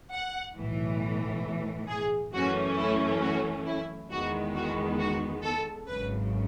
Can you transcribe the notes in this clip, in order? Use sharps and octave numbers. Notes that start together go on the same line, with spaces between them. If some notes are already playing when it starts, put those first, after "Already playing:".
F#5
B1 A2 E3
G#4
F#2 E3 A3 C#4 F#4
E4
F#4
E4
E2 D#3 G#3 B3 F#4
F#4
F#4
A4
G#1 F#2 C#3 B4